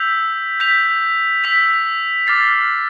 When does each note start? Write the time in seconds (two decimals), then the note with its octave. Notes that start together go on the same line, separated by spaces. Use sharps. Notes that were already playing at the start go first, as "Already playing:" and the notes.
Already playing: E6 G6 B6 F7
0.60 G6 B6 F7
1.44 E6 B6 F7
2.27 D6 F6 A6 C7